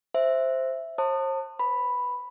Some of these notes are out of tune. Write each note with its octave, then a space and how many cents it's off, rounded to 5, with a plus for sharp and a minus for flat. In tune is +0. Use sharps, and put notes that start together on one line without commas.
C5 +0 E5 +0
C5 +40 A5 +30 D#6 -30
B4 +0 B5 +0